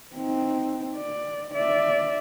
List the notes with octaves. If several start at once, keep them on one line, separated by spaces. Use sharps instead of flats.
C4 D#4
D5
D5 E5